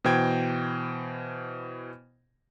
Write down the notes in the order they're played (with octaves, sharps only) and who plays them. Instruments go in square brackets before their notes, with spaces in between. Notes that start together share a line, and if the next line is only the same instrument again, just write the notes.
[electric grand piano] B2 E3 C5 G5 G#6